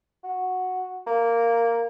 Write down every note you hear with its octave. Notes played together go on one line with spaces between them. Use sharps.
F#4
A#3